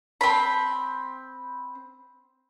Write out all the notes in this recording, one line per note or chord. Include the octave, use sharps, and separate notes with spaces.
C4 B5